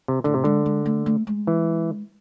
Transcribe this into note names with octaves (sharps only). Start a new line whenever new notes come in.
C3
A2 D3
C3
D3 G#3
G#3
A3
A3
G#3
E3